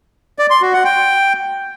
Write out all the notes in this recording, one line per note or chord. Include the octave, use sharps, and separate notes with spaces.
D5
C6
F#4
F#5
G5